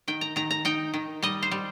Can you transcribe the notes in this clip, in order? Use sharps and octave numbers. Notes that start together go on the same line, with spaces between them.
D#3 G5
A#5
D#3 A#5
A#5
D#4 G5
D#3
G3 D#5
C5
G3